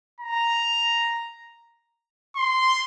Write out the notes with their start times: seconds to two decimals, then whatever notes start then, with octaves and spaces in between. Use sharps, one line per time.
0.21 A#5
2.36 C6